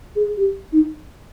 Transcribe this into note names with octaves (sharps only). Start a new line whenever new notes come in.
G#4
G4
D#4